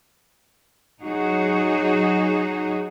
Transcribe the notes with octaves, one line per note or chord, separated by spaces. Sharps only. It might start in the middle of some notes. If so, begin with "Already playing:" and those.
F#3 D#4 F#4 G#4